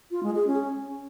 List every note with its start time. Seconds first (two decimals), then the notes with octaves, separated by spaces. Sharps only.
0.11 F4
0.23 G#3
0.35 G#4
0.47 C#4